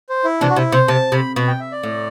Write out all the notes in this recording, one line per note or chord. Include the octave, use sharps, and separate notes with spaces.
C5
E4
C3 E3 D4
F#4
C3 E4
C3 C5
C3 A5
C3 B5
B2 B5
G5
E5
D5
A2